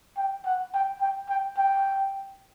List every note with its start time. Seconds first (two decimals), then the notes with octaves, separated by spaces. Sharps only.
0.17 G5
0.45 F#5
0.73 G5
1.01 G5
1.29 G5
1.57 G5